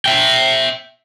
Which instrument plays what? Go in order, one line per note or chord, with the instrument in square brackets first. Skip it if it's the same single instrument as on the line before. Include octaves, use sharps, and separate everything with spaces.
[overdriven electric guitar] E5 G5